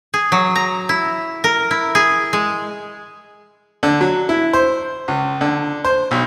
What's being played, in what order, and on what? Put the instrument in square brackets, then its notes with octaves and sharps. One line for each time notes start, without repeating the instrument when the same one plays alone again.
[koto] G#4
F#3
A#5
E4
A#4
E4
G#4
G#3
[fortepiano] D3
F#3
E4
C5
C#2
D3
C5
B1